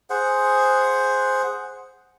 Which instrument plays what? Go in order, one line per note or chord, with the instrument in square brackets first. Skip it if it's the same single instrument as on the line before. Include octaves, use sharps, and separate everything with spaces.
[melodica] G#4 C5 F#5